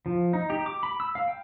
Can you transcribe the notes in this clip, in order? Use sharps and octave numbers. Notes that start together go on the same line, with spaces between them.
F3
D#4
G4
D6
B5
E6
F5
G5